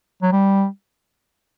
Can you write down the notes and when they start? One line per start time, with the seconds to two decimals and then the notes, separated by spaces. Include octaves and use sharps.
0.22 F#3
0.32 G3